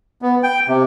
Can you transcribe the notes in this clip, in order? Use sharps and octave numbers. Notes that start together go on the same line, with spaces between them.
B3
G5
C3